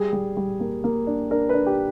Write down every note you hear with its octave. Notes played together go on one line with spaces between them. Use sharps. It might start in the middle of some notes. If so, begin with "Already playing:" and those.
Already playing: G3 G#4
G3
G3
A#3
A#3
D4
D4 A#4
B4
D4
G4